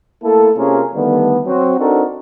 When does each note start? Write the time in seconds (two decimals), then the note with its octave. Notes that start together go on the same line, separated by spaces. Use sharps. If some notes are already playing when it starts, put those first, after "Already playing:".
0.23 A3 A#3 E4 A4
0.56 C3 A#3 C#4 F4 G#4 A#4
0.95 D3 D#3 G3 A3 B3
1.45 F#3 C4 F#4
1.78 C4 D4 D#4 F#4 A4 A#4